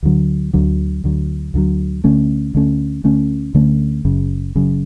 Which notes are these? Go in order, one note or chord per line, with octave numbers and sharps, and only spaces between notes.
D2 D3 F#3
D2 D3 F#3
D2 D3 F#3
D2 D3 F#3
D2 D3 A3 C#4
D2 D3 A3 C#4
D2 D3 A3 C#4
D2 D3 A3 C#4
F#1 F#2 C#3
F#1 F#2 C#3